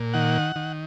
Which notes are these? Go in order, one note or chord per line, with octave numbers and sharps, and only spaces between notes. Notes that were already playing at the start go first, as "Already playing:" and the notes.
Already playing: A#2
D#3 F#5
D#3